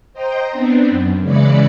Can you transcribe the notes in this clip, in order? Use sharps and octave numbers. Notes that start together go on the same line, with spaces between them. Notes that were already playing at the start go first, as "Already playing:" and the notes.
C5 D#5 G5 A#5 C6
B3 C4 D4
F#2
C#3 E3 G#3 D5 B5 C#7